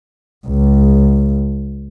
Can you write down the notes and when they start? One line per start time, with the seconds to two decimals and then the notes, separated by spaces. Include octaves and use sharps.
0.47 C#2